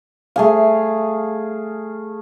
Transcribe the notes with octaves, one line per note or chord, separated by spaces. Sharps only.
A3 G#4 F5